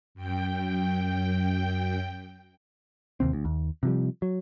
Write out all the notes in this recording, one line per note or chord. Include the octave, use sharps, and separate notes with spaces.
F#2 G5
D#2 C3 C4
D2
D#2
C3 F3 G3
F#3